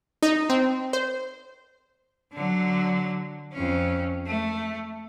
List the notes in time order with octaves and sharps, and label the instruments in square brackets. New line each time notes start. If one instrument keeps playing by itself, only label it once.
[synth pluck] D#4
C4
C5
[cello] D3 F#3
F2 C#4
A3